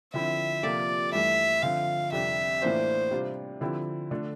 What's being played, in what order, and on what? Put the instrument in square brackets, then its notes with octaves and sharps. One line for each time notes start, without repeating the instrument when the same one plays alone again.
[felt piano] D3 F3 C4 E4 [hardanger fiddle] E5
[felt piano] C3 F3 A#3 F4 A4 [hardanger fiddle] D5
[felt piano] G2 E3 A3 [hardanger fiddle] E5
[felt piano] D3 F3 C4 [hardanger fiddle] F5
[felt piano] F2 C3 G3 D4 [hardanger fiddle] E5
[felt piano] A2 E3 A#3 D4 [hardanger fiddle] C5
[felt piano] C3 G3 D4 F4
D3 F3 C4 E4 G4
D3 A3 D4 A4